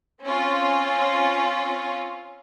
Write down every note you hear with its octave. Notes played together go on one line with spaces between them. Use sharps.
C4 C#4 F4